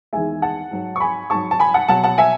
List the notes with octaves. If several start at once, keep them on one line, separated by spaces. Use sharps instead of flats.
E2 D#3 G#3 E5 G#5
F#5 A5
G#2 F#3
C#6
G#5 B5
G#2 F#3 A5 C#6
A5
G#5 B5
F#5 A5
B2 F#3 F#5 A5
F#5 A5
E5 G#5